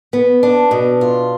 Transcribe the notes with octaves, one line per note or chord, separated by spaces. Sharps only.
B3
D4
B2
F4